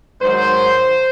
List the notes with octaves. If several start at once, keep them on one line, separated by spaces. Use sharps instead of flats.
G#2 D#3 F#3 C5